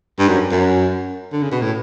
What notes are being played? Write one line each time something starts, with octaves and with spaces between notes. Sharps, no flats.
G2
F#2
F#2
D3
C#3
B2
A2